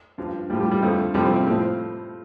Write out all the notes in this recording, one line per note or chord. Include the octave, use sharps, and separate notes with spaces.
G2 F3
A2 F3 G3 G4
G3 G4
G3 G4
F2 D3 F3 A3 A4
F2 C3 F3 G3 G4
C4
C4
A2 F3 C4